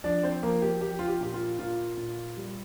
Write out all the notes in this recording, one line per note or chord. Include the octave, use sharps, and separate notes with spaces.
F3 D4 D5
C4 C5
F3 A#3 A#4
G4
F3 G4
F4
G4
A#2 G4
F4
A#2 F4
A#2
G3